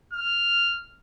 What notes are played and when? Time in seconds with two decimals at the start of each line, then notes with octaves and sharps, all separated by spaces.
0.13 F6